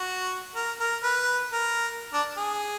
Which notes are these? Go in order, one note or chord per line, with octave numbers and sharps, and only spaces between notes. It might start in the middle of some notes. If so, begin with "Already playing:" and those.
Already playing: F#4
A#4
A#4
B4
A#4
D4
G#4